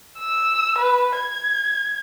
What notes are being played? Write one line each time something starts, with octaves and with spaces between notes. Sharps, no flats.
E6
B4
G#6